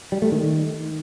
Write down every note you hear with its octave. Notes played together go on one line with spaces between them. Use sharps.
G3
A3
D#3